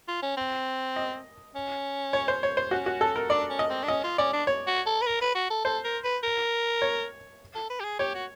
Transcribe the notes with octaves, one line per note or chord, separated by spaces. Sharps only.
F4
C#4
C4
D#5
C#4
C#5
C5
C#5
C5
C#4 F#4
F#4
A4
A#4
D4 D5
C#4
D#5
C4
D4
C#4 D#5
F4
C#4 D5
D4
C#5
F#4
A4
B4
A#4
B4
F#4
A4
A4 C5
A#4
B4
A#4
C#5
A4
B4
G4
G#4
G4 C#5
F#4